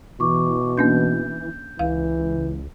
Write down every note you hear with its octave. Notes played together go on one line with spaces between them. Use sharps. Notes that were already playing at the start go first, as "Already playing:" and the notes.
B2 E3 C#6 D6
A#3 C#4 D4 G6
C#2 E3 F5